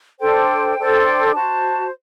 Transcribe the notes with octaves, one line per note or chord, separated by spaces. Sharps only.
D4 A4 C5 G5
D4 A4 C5
G5
F#4 C5 A5